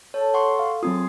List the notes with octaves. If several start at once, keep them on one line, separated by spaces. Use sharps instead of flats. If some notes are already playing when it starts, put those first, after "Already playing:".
A4 C#5
F#5 C6 C#6
F5
F#2 F#3 C4 F4 G#4 C6 D#6